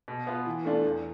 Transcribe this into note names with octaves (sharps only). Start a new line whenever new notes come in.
B2
B3 F4 B4
E3
A3 D4 F4 A4
E2